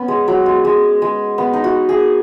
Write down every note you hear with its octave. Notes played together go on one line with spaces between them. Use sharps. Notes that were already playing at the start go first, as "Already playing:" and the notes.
Already playing: B3 C#4
G#3
F#3
G#3
G#3
G#3
B3
D#4
F#4
G#4